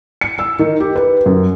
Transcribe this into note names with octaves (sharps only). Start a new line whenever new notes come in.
C#7
E6
D#3
G4
B4
F#2